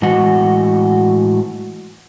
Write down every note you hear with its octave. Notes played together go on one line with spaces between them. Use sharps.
A2 E3 G#3 F#4 D#5 F#5